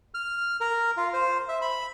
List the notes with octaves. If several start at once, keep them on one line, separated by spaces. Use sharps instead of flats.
F6
A#4
F4
C5
E5
B5